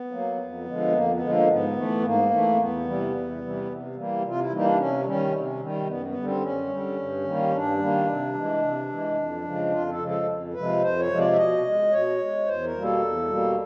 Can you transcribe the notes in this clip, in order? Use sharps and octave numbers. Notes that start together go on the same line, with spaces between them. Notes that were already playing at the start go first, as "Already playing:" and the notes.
Already playing: B3
F#3 A#3
F2
D3 F3 G#3
F2 A#3
B3
D3 F3 G#3
A#3
G#2 B3
E3 A3
G#2 A#3
E3 A3
C4
E2 B3
C3 E3 G3
E2
C3 E3 G3
C3
E3 G3 A#3
C3 F4
E4
E3 G3 A#3 D#4
D4
C3 C#4
D#3 G3 C#4
C3
D#3 G3
F#2 B3
B3
D3 G3
C4
F#2 C#4
D3 G3
G2
D#3 G3 A#3
G2 D4
D#3 G3 A#3
C3
E3 G#3
C3
E3 G#3
F2
C#3 F3 G#3
F2 F4
A4
C#3 F3 G#3
A4
F2
C3 F3 G#3 B4
F2 C5
C#5
C3 F3 G#3
D5
E5
B2 D#5
G#3
B2 C#5
G#3
E2 C5
A#4
B2 G3 A#3
A4
E2
B2 G3 A#3